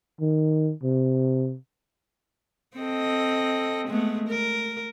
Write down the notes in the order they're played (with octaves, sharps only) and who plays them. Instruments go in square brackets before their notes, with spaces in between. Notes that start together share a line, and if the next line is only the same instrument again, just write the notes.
[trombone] D#3
C3
[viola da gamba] C4 A4 D#5
G#3 A3 B3
A#4